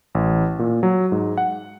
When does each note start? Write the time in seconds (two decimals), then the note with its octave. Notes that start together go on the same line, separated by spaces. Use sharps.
0.15 A1
0.59 A#2
0.83 F#3
1.12 G#2
1.37 F#5